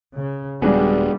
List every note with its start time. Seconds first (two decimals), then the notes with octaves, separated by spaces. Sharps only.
0.16 C#3
0.62 D#1 G3 G#3 B3 D4 F#4 G#4